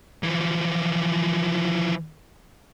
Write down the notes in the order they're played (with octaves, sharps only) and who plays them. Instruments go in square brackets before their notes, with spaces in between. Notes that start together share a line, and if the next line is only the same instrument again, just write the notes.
[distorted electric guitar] E3 F3